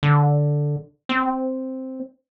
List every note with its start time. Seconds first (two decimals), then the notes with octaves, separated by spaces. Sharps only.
0.03 D3
1.09 C4